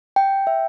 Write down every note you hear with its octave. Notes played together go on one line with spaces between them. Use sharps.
G5
E5